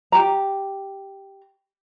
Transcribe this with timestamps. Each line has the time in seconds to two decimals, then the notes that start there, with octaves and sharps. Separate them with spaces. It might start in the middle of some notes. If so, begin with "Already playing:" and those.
0.12 G4 A#5